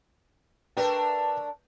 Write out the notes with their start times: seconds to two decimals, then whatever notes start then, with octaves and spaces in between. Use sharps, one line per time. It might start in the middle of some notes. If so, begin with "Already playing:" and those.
0.77 A3 D4 A#4 B4 G5